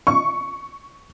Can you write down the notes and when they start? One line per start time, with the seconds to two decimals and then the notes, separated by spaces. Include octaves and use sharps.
0.07 C#6